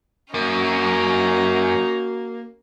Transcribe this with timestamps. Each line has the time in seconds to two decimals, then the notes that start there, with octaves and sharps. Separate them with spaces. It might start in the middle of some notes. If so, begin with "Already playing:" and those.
0.34 F#2 A#3 C#4 D#4 F#4